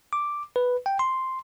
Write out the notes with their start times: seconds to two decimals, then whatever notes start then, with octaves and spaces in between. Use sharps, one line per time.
0.13 D6
0.56 B4
0.86 G5
0.99 C6